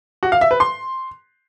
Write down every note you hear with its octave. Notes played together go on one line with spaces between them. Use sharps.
F#4
F5
E5
B4
C6